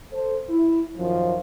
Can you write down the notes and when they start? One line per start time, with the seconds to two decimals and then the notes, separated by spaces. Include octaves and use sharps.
0.12 A4 C5
0.49 E4
0.98 F#2 D#3 F3